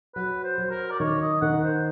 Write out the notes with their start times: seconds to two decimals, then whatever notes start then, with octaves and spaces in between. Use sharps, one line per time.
0.15 F#3 B4
0.44 C5
0.58 F#3
0.71 A#4
0.91 D5
0.99 D#3 C#5
1.21 D#5
1.41 D#3 F#5
1.64 C5